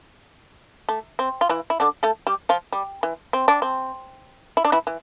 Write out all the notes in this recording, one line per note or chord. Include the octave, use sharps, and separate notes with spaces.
A3
C4
F4
E3 E4
E4
D3 D4
A3 A4
G3 G4
F3 F4
G3
E3
C4
D4
C4
E4
D4
E3 E4
E3